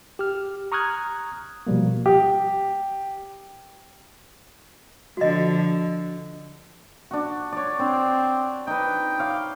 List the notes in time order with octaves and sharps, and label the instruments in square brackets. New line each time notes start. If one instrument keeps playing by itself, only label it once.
[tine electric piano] G4 F6
A#5 C#6 D#6 F6 F#6 G#6
B2 F3 G3 A#3
[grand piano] G4
[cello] D3 F3 [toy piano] F#4 D#5
[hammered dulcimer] D4 F#4
C#5 D5
[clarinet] C4 [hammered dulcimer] D4 C5
[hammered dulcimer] D#4 B4 [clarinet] G5
[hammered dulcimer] C#5 F5 D6